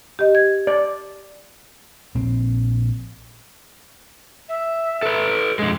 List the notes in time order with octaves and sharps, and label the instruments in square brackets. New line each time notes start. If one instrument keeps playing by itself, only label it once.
[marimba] G4 D#5
G#6
[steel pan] D5
[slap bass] A#1 C4
[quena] E5
[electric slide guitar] A4 B4
F2 G#3